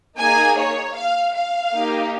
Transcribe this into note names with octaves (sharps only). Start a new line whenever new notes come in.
A#3 D#4 G#4 G#5
C#5
F5
F5
A#3 D#4 G4